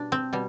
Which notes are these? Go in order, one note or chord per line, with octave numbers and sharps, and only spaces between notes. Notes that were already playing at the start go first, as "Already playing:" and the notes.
Already playing: B2 G3 D4
C4
B2 G3